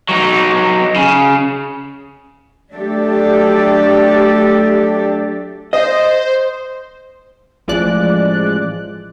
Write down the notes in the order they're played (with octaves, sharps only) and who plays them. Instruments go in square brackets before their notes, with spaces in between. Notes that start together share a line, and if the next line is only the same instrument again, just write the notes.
[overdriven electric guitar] F#3 D#4
C#3
[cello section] F#3 A3 D4 G4 A4
[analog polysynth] C5 [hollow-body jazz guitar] D#5
[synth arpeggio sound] A1 F3 G#3 D5 F#6